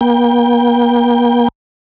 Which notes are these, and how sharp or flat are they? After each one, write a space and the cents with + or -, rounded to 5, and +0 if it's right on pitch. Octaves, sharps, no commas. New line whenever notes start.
A#3 +45 G5 +20